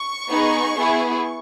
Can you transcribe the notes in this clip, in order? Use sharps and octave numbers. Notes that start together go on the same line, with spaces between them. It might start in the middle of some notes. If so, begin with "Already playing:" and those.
Already playing: C#6
B3 D#4 G#4
B3 E4 G#4